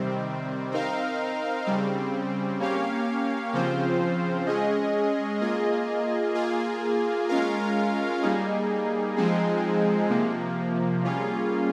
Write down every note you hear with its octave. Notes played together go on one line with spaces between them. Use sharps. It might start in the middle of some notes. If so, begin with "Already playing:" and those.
Already playing: C3 D#3 G3 C4
C4 D#4 A#4 F5
C#3 G3 C4
A#3 C#4 G4 C#5 F5
C#3 F3 C4 F4 C5
G#3 C#4 G#4 D#5
A#3 F4 G#4 D#5
A#3 F4 G#4
G#3 C#4 F4 A#4 F5
G3 A#3 D#4 G#4
F3 G#3 C4 D#4 G#4
C3 F3 A#3
G3 A#3 C#4 F4 G#4